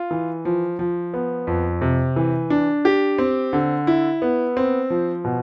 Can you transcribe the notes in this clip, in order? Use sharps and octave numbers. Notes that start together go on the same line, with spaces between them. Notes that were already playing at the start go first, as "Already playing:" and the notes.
Already playing: F4
E3
F3
F3
B3
F2
C3
E3
D4
G4
C4
D3
E4
B3
C4
F3
B2